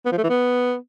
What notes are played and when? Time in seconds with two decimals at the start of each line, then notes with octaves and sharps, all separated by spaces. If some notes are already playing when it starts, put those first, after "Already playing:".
0.06 B3
0.12 F3
0.18 A3
0.24 E3
0.30 B3